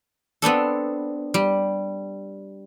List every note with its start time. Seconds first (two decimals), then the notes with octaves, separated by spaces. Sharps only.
0.42 B3 C4 D4 A4
1.34 G3